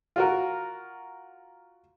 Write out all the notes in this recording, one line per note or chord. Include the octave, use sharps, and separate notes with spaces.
F4 F#4 A#4